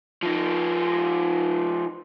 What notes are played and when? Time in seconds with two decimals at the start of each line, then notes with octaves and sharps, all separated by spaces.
0.23 F3 D#4